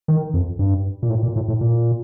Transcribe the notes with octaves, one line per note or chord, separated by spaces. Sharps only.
D#3
F2
G2
A#2
A2
A#2
A2
A2
A#2